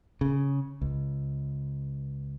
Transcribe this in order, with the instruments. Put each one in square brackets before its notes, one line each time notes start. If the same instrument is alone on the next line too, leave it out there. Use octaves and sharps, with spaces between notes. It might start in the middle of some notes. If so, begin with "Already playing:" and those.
[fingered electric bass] C#3
C#2